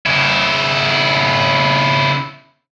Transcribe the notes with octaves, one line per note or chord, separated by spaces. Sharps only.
C#3 E4